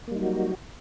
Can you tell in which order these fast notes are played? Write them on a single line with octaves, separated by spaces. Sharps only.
A#3 G3 D#4 F#3 F#4